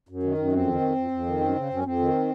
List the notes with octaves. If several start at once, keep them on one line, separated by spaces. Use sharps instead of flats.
F#2
D#3
F#2
F2 C4
D#3
F2
F2
F2
D#3
F#2
C#3
F#2 C#4
F2 C4
D#3